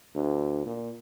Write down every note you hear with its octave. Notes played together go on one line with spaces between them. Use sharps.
D2
A#2